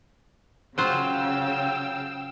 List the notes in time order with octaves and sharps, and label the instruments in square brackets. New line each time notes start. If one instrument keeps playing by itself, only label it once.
[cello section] C#3 [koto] F#3 F4 C5 [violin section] F5 G5 E6